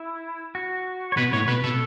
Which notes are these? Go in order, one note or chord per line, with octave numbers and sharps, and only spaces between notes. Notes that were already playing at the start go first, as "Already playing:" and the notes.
Already playing: E4
F#4
C#5
B2 B4
A2 C#5
B2 B4
B2 A4